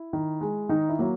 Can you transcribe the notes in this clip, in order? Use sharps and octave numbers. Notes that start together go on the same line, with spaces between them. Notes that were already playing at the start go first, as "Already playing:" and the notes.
Already playing: E4
D#3
G#3
D#3 D#4
E4
F#3 A#3